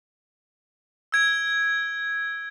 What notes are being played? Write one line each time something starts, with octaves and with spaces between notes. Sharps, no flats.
E6 G#6 D7